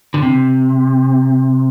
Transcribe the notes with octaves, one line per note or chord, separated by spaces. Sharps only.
D3
C3